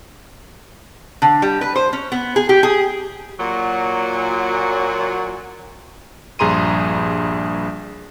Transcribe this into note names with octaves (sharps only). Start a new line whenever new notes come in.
D3
G3
B4
C5
C#4
B3
G#4
G4
G#4
A#2 F#3
A#1 G2 G#4 A#5 C6 D#7